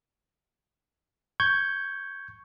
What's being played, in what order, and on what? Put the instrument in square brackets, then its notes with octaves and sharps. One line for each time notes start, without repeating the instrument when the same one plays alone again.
[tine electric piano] C#6 G6 G#6